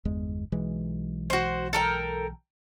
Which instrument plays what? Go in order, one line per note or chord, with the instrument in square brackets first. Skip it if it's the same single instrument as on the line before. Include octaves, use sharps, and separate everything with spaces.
[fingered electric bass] G1 E2 G#3
B1 E3 G#3
[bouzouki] F#4 C5
A4 A#4 G5